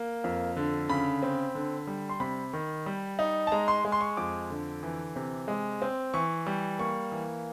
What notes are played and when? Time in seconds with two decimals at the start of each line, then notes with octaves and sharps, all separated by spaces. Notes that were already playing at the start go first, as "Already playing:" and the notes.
Already playing: A#3
0.24 F2
0.56 D3
0.90 C#3 B5
1.23 C4
1.55 D3
1.87 G3
2.09 C6
2.20 C3 B5
2.53 D#3
2.86 G3
3.19 D#4
3.47 A5
3.52 G#3 A#5
3.68 C6
3.85 G#3
3.92 C6
4.01 C#6
4.17 F2 D6
4.50 D3
4.83 E3
5.16 C3
5.48 G#3
5.82 C4
6.14 E3 C#6
6.46 G3
6.79 A#3 C#6
7.12 E3